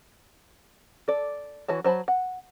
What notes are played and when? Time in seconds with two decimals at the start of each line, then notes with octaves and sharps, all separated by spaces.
1.08 A4 D5
1.68 E3 F#4 C#5 A5
1.84 F#3 C5 A5 B5
2.08 F#5